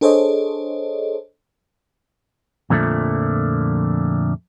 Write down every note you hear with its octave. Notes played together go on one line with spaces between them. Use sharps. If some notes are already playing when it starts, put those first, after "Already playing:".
D4 G#4 A4 C5 C#5 D#5
F2 A#2 D3 F3 A3